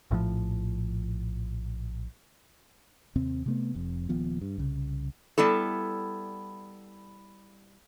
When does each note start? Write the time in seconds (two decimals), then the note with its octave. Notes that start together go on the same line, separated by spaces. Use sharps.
0.11 A#1 A2 D3 F3
3.15 D#2 C3 C4
3.46 C3 A3 B3
3.74 F1 F2
4.09 D#1 D#2 F3 B3
4.41 G2
4.58 C2 C#3
5.38 G3 B3 E4 A4